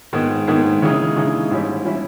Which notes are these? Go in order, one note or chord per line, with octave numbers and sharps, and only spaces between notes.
G#2 D#3 G#3 B3
G#2 D#3 G#3 B3
C#3 E3 G#3 D#4 G#4
C#3 E3 G#3 D#4 G#4
G#2 E3 G3 C#4 E4
E3 G3 C#4 E4